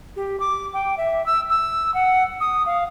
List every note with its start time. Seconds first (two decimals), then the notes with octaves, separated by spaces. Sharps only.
0.16 G4
0.40 D6
0.73 G5
0.97 E5
1.26 E6
1.50 E6
1.94 F#5
2.41 D#6
2.66 F5